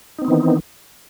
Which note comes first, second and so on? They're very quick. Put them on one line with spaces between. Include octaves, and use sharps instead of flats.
D#4 C4 B3 D#3 E3